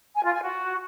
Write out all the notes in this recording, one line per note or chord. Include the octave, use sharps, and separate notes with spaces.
G#5
F4
G#5
F#4